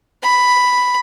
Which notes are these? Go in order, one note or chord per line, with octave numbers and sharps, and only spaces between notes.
B5